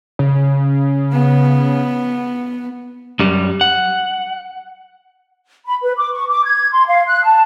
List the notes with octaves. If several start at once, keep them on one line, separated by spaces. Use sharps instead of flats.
C#3
B3
F#2 G3
F#5
B5
B4
D6
C#6
D6
G#6
C6
F5
F#6
A5